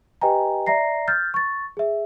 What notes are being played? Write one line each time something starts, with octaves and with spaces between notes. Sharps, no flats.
G4 B4 D#5 G5 G#5 A#5
D5 E5 A#5 A#6 C7
F6 G6 A6
C#6 A6
G#4 E5